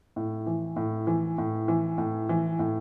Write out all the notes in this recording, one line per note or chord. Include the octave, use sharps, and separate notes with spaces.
A2
E3
A2
E3
A2
E3
A2
E3
A2